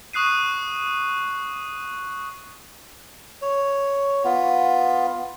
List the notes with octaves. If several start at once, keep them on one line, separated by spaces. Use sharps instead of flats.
C#6 D#6 F#6 C7 D#7
C#5
B3 F4